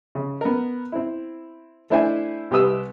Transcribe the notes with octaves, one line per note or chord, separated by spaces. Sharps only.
C#3
B3 A#4
C4 E4
A3 D4 E4 C5 E5 G#5
C2 G4 B4 D#6 E6